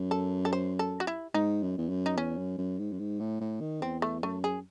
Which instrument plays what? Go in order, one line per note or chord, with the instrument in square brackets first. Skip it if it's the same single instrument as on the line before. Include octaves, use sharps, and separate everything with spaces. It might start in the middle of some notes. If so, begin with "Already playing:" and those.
Already playing: [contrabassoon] F#2
[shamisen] A4
A4
C5
A4
F#4
E4
[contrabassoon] G#2 [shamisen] D#4
[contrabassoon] F#2
E2
F#2
[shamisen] D#4
[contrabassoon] E2 [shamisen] C#4
[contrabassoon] F#2
F#2
G#2
F#2
G#2
A2
A2
D#3
[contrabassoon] E2 [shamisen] C4
[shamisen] A3
[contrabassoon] F#2 [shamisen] A3
[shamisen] G#4